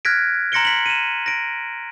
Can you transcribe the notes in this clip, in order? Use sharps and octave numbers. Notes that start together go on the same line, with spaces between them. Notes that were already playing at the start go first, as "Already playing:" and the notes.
F6 F#6 G#6 A#6 B6 D7
A#5 C6 A#6 C#7 D7 G7
B6 F#7
D#7 E7
A#6 D7